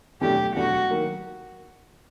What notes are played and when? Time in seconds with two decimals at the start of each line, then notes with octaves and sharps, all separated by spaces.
0.21 E2 B2 F#3 A3 D4 G4
0.56 E2 B2 F#3 A3 D4 F#4
0.90 D#3 F#3 A#3